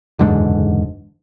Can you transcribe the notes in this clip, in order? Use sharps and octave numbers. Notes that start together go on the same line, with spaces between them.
F#1 E2 G#2 D3